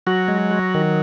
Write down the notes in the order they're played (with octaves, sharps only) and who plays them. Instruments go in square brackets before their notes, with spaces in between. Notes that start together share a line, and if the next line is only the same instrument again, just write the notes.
[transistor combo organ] F#3 [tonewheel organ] F#4
[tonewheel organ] G#3
F#4
D#3